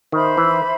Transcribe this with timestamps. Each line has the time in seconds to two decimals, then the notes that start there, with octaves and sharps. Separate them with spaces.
0.12 D#3 C5 E5 B5
0.37 E3